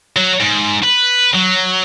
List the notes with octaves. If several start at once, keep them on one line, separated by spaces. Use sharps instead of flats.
F#3
G#2
B4
F#3